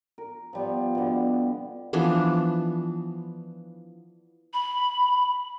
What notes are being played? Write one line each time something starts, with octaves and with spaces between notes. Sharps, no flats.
A#4
F3 G3 B3
B2 D3
E3 F3 B3 D4
B5